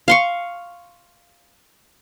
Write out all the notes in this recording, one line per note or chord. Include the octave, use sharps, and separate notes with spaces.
F5 C6 C#6